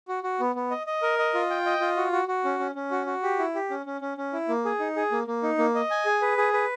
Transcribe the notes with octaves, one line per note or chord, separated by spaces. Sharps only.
F#4
F#4
B3
B3
D#5
D#5
A#4
D#5
F4
G5
D#5
F4
F#4
F#4
F#4
C#4
C#4
C#4
F#4
F#4
G4
E4
G4
C#4
C#4
C#4
C#4
E4
A#3
G#4
D#4
G#4
A#3
A#3
D#4
A#3
D#5
G#5
G#4
B4
G#4
B4